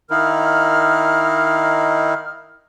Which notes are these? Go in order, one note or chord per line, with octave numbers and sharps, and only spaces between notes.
D#3 D#4 E4 A#4 F5 F6